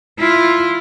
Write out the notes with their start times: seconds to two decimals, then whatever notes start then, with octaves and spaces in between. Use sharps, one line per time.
0.19 E4 F4